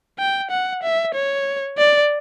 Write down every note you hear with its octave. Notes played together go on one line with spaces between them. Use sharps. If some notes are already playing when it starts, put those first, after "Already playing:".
G5
F#5
E5
C#5
D5